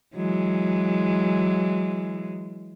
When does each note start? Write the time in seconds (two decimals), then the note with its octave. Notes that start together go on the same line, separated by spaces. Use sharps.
0.15 E3 F#3 G#3